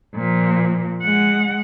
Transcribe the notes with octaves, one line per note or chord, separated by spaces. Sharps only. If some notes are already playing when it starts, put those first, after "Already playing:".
A#2 F3
G#3 F#5